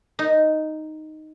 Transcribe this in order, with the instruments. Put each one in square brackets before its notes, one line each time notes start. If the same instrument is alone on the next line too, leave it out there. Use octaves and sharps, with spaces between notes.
[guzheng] D#4